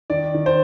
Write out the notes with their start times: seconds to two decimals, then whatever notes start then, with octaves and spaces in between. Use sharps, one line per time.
0.10 D#3 D5
0.34 D#3
0.46 C5